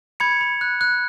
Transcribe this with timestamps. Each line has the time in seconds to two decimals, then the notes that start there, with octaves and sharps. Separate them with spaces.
0.20 B5 G#6 C#7
0.41 B5
0.61 F#6
0.81 F#6